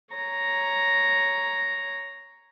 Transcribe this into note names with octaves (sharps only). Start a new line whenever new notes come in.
C#5 A#5